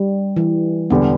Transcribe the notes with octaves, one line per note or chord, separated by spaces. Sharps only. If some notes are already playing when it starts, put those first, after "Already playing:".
Already playing: G3
E3
E1 E2 D3 G3 B3